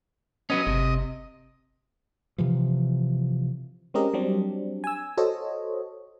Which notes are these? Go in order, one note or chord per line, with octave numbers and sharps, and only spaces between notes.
F#3 B3 C#4 D#5
G1 C3
C3 E3 F3
G#3 C4 C#4 G4 A#4 D#5
F#3 G3 C4 D4
G#5 E6
F#4 A4 C5 C#5 D#5